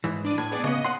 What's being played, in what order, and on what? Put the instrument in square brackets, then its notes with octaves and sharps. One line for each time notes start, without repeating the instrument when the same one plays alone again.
[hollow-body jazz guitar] G#2 E3
[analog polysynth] D4 D5 D#7
[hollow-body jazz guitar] A2 [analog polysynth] G#6
[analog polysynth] B3 G#4 D5
[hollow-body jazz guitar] C#3 B3 [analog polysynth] D#5
[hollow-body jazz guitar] F#5 C6